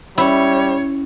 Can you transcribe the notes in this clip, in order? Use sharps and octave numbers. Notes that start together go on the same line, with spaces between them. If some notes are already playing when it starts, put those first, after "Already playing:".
G3 C#4 E4 C#5